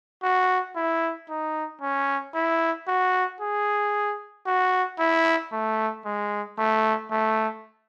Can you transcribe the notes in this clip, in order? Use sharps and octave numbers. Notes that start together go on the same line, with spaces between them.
F#4
E4
D#4
C#4
E4
F#4
G#4
F#4
E4
A3
G#3
A3
A3